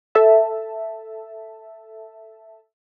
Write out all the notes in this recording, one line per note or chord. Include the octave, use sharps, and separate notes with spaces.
A4 E5 A5